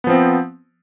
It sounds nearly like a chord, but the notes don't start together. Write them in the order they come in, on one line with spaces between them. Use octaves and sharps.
B3 F3 C4